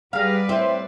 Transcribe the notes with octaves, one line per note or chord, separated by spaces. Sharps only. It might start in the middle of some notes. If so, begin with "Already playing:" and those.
G3 G4 G#4 B4 D5 F5 A#5
A2 C4 E4 C5